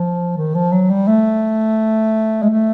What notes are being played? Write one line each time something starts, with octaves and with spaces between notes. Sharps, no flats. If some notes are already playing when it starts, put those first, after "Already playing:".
Already playing: F3
D#3
F3
F#3
G3
A3
G#3
A3